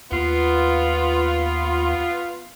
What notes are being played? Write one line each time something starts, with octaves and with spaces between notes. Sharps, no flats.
D#2 B3 F4